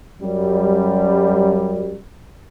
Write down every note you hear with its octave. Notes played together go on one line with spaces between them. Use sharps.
F#2 G3